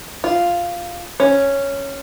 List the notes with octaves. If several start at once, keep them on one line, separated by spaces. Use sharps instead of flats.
F4
C#4